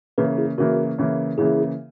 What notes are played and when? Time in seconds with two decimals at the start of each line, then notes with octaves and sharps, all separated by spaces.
0.18 C#3 E3 A#3 G#4 B4
0.38 E4 G#4
0.58 C#3 E3 A#3 F#4 A#4
0.98 C#3 E3 A#3
1.38 C#3 E3 A#3 E4 G#4